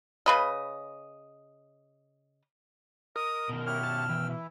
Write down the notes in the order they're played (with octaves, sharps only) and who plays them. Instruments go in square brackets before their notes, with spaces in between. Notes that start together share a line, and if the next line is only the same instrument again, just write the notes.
[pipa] C#3 B4 D#5
[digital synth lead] A#4 [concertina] D#5 [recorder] D#6
[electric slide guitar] B2 D#3
[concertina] E4 G4 C#5 [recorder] F6
[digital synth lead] A5
[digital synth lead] E3 [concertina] G5 E6
[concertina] E4